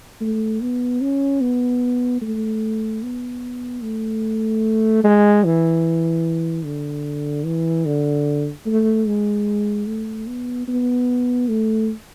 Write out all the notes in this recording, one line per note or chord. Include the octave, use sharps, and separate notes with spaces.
A3
B3
C#4
B3
A3
B3
A3
G#3
E3
D3
E3
D3
A3
G#3
A3
B3
B3
A3